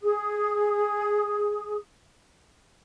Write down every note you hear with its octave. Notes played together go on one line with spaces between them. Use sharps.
G#4 D#6